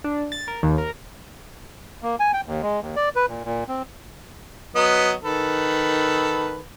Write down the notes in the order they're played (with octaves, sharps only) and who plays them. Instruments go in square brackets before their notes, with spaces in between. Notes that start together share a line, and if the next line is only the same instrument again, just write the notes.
[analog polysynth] D4
A6
A#4
D#2
A#4
[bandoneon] A#3
G#5
G5
D#2
G#3
D#2
D5
B4
A#2
A#2
C4
[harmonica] F#3 B3 D#5
D#3 A4 B4